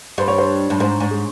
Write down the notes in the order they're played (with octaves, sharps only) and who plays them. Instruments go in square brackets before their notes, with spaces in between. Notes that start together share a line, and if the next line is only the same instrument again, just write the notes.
[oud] G2 [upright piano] C5
[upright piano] C#5
C5
[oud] G2
[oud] G#2 [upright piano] C5
[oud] G#2
[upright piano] G#4